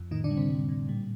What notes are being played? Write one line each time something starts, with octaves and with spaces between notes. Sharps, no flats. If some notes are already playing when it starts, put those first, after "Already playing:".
Already playing: F2
A2 D#3 D#4
D3 D4
G3
C3 C4
G3
A2
A#2 G3